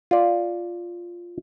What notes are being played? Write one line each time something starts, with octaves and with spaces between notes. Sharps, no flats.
F4 D5